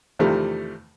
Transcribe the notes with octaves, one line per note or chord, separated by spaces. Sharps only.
E2 C3 D#3 F3 G3 A3